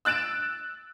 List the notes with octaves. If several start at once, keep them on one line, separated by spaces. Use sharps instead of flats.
E6 F#6 A6 D7 E7